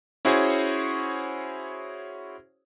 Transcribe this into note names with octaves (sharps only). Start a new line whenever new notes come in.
C#4 E4 F#4 G#4 C5 C#5